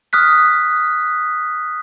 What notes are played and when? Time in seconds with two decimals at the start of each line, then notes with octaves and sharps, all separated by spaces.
0.13 D#6 F6 F#6 B6